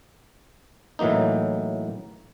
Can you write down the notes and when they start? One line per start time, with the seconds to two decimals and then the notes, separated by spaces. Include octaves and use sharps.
0.99 A2 E3 F#3 A#3 D#4